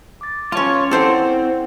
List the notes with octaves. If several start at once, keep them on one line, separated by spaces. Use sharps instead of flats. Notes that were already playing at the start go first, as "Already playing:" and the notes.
D6 A6
C#4 F4 C#5 A5
C4 E4 A4 C5 D5 F#5